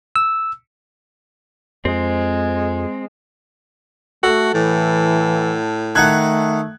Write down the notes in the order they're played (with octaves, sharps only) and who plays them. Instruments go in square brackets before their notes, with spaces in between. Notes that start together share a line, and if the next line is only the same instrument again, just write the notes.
[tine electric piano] E6
[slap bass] F2 [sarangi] G#3 [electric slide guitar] C4
[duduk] A3 [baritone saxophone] F#4 [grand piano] A4 F#5 A5
[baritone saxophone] A2 [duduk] E3
[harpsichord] D#3 D#4 F#5 [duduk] A3 [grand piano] A5 F#6 G#6